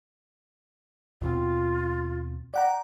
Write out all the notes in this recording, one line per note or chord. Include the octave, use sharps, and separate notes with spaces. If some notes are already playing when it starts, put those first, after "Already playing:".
D#2 B2 C4 F4
D5 F#5 G5 A#5